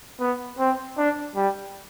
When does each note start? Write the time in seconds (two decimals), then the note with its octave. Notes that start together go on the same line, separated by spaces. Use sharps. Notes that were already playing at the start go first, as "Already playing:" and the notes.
0.20 B3
0.59 C4
0.97 D4
1.36 G3